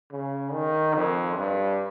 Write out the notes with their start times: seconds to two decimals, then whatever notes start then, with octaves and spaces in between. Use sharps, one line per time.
0.12 C#3
0.53 D#3
0.94 F2
1.36 G2